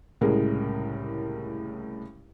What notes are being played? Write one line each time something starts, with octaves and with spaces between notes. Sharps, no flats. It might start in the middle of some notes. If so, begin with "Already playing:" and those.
C2 A2 C#3 G#3 A#4